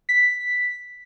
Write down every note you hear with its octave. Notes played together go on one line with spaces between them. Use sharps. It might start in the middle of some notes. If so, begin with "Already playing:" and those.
B6